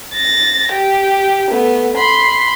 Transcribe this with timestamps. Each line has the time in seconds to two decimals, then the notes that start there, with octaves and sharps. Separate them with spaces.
0.14 A6 A#6
0.72 G4
1.50 A3 B3
1.97 B5 C6